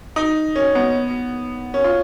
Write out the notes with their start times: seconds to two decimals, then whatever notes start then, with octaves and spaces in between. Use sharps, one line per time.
0.16 D#4
0.56 C#4
0.75 B3
1.74 C#4
1.84 F4